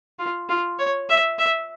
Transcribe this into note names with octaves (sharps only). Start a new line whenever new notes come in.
F4
F4
C#5
E5
E5